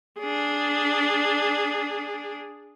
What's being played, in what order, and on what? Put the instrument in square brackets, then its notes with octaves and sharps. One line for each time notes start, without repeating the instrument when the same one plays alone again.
[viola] D4 G#4